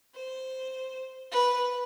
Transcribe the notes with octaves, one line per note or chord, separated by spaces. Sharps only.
C5
B4